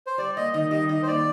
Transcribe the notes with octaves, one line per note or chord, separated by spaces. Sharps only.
C5
G3 D5
A#3 D#5
D#3 D#5
G3 D#5
D#3 D#5
C5
A#3 D5